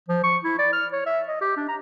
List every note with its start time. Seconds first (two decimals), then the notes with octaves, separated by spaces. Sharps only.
0.08 F3
0.24 C#6
0.44 E4
0.59 D5
0.73 F6
0.92 C#5
1.06 E5
1.28 D#5
1.41 G4
1.57 D4
1.68 A#5